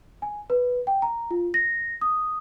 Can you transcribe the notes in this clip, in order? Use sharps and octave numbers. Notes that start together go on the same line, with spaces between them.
G#5
B4
G5
A#5
F4
A#6
D#6